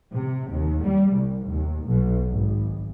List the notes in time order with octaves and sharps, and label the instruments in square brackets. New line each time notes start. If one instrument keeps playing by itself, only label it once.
[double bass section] C3
D#2
G3
C2
D#2
B1
G#1